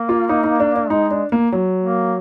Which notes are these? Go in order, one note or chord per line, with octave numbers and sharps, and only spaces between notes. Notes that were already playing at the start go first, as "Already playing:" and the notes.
Already playing: A#3
F4
D#4
D#4
D4
D4
G#3 D#4
D4
A#3
F#3
A#3